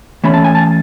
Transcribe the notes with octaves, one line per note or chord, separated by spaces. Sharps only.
E3 A3 C#4 B5
A5
G#5
A5